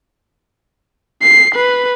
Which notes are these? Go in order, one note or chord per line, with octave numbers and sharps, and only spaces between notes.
C7
B4